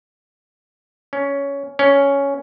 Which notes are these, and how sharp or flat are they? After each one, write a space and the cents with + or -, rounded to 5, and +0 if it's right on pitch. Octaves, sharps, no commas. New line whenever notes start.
C#4 +10
C#4 +5